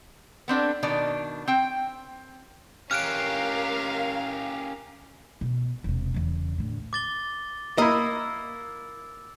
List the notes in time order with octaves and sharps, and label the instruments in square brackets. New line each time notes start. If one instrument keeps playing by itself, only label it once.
[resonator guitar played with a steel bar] B3 C4 D4 A4
B2 D#3 D4 D5
C4 G5
[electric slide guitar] C#4 G4 [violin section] A#4 F5 [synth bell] F6 F#6 D7
[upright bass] B2
E1 C3
E2 C#3
A2 D3
[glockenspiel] D6 A6 G7
[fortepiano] A#3 E4 [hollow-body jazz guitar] D#5 [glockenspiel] E6